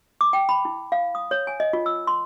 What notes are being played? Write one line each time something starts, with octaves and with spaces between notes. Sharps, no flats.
D6
G5
B5
E4
F5
D#6
C#5
G#5
D#5
F4
E6
C6